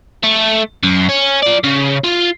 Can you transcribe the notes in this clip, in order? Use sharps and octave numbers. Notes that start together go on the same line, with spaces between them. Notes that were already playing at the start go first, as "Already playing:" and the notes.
A3
F#2
C#4
F3 D5
C#3
F4